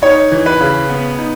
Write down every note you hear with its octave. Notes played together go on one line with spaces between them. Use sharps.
D#4 C#5
E3
B4
C#3
B3
D#4